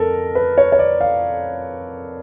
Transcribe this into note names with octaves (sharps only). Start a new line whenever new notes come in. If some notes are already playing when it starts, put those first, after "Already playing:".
Already playing: F2 A4 A#4
B4
C#5
C#5
D5
F5